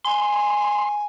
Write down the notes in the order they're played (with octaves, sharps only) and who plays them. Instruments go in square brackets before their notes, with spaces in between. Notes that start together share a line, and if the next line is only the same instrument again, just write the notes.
[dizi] G#5 [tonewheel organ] C6